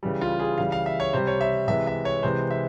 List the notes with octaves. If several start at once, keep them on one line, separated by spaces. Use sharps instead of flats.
C#3 E3 G3
F4
G#4
C#3 E3 G3 F5
F5
E5
C#5
C3 G3 C5
C#5
E5
C3 E3 G#3 E5
E5
C#5
C3 E3 G#3 C5
E5